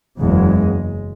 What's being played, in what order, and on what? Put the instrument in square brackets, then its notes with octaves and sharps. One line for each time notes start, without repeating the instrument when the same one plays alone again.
[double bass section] F#1 E2 C#3 G#3